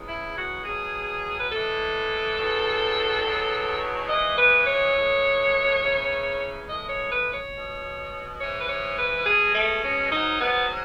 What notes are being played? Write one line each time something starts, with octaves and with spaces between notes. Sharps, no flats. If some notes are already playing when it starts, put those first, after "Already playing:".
Already playing: E2 C#3 G#3
E4
F#4
B2 F#3 G#4
B4
A2 E3 G#3 A4
E2 B2 F#3
E2 B2 F#3
G#2 E3 G#3 D#5
B4
C#5
A2 E3 G#3
E2 C#3 E3
A2 E3 G#3 D#5
C#5
B4
C#5
B2 G#3
G#2 E3 G#3 C#5
B4
C#5
B4
B2 G#3 G#4
A3
C#4
G#2 F#3 D#4
B3